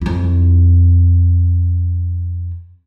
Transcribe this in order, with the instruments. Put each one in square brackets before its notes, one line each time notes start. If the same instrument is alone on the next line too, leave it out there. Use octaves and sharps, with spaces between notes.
[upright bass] F2 E4